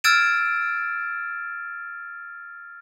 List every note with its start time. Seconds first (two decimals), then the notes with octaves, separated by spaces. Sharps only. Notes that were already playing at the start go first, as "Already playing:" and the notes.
0.04 E6 F6 G#6 A6 D7 E7